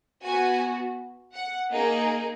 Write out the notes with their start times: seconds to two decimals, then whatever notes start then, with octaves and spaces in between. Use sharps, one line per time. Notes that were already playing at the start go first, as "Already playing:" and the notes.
0.23 B3 F#4 G#5
1.34 F#5
1.71 A#3 D#4 G#4